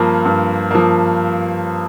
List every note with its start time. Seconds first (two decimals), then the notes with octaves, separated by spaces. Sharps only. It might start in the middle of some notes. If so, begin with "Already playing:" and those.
Already playing: G2 F3 A#3
0.25 G2
0.71 F3 A#3